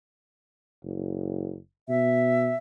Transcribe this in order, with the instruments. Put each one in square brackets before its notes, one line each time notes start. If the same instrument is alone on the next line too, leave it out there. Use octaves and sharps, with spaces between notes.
[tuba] F#1
[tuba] B2 [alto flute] E5